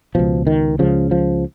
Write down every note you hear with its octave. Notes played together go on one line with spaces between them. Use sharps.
C#2 B2 F3
D#3
C#2 C#3 F3
F3